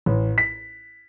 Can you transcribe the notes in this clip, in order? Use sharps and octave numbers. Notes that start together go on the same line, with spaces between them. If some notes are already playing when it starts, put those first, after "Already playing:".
A1
B6